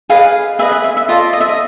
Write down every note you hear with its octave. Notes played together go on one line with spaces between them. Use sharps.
G#4 B4 D#5 F5
G#4 B4 D#5 E5
E5
E5
E5
F4 A4 D5 D#5
D#5
E5
D#5